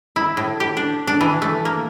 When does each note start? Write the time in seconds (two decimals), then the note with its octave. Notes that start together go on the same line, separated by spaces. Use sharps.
0.16 E4
0.37 A2
0.60 G4
0.77 D4
1.07 D4
1.21 E3
1.42 A3
1.65 A#3